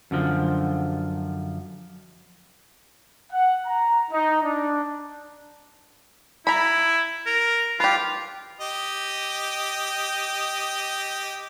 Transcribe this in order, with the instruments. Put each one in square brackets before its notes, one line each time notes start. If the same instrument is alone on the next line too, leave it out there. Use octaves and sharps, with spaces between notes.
[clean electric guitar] F#2 D3 F3
[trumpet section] F#5
A#5
D#4
D4
[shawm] E4 [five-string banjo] A#5 B5
[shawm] A#4
[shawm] F4 [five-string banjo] G4 B4
[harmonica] G4 D#5